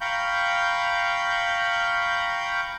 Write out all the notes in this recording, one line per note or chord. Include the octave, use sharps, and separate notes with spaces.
F5 G5 A#5 B5 C#6 G6